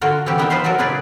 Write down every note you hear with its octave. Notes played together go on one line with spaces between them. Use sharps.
D3 F4 F#4 A#4
C3 E3 E4 F#4 G4
A#3 B3 D#4 A#4 E5 G5
F3 F4 B4 C5 F5
A#2 F#3 F#4 A4 A#4
C#3 D#4 F4 G#4 B4 D5